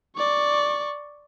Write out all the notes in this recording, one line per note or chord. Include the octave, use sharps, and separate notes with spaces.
D5 C#6